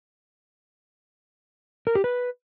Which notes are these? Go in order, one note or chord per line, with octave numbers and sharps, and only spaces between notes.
A#4
G4
B4